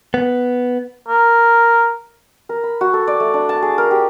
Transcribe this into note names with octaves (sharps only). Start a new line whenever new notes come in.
B3
A#4
A#4
B5
F#4
A4
D5
A3
D4
A5
G#4
A#4
G4